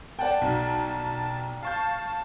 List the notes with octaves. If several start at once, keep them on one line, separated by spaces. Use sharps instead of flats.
D5 F#5 G5 A5
B1
F5 A5 C#6 G6